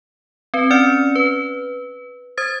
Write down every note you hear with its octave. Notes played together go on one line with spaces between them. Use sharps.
C4 B4
C#4 D5 F6 C#7
B4
C5 D#6 G#6 A6